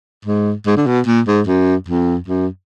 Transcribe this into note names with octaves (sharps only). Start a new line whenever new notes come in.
G#2
G#2
D3
B2
A#2
G#2
F#2
F2
F#2